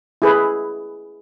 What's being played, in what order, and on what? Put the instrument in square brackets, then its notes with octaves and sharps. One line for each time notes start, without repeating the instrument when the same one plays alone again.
[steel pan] E4 G#4 B4